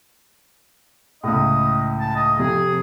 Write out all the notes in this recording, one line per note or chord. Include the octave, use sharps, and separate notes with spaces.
C#2 A2 D#5
A5
D#5
F2 C3 G#4